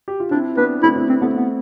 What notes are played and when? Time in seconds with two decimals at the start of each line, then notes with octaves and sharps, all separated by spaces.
0.08 G4
0.20 F4
0.31 C4 D4 E4
0.57 B3 D4 B4
0.83 A3 C4 E4
0.96 C4 E4
1.09 C4
1.21 A3 B3 C4
1.34 B3